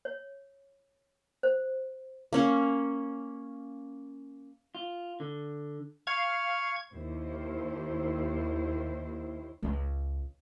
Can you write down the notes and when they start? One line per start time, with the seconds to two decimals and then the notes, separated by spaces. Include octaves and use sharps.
0.05 C#5
1.43 C5
2.33 A#3 C#4 C#5
4.75 F4
5.20 D3
6.07 F5 C#6 G#6
6.92 D#2 E4 C5
9.63 C#2